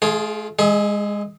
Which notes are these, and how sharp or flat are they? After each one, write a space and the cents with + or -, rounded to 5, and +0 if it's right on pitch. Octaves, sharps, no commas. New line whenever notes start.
A3 -45 F4 +0 G#4 +0
G#3 -15 G#4 +30 E5 -20